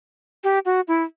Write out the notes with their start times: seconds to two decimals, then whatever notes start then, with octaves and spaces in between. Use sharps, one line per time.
0.44 G4
0.65 F#4
0.88 E4